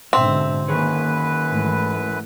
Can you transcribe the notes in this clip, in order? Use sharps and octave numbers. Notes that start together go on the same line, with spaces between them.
G#2 B2 D3 C4 E5
F#2 D#3 A#3 G#4 B4 C#5
G#2 E3 A3